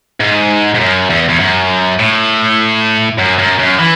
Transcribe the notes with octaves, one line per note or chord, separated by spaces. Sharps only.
G#2
G#2
F#2
E2
E2
F#2
A2
F#2
F#2
F#2
E3